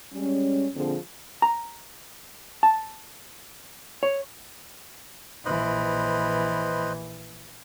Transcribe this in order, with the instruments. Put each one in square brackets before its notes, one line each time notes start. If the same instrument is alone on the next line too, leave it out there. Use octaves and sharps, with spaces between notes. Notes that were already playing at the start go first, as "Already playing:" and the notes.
[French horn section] G3 G#3 C#4
A#2 D3 F3 C4 G#4
[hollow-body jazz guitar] A#5
A5
C#5
[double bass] A#1 E3 [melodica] B4 C5 D#5